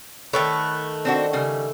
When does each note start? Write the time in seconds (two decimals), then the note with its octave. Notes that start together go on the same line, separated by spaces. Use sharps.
0.33 D#3 A3 A4 B4 C#5
1.05 C4 D4 F#4
1.33 C#3 G3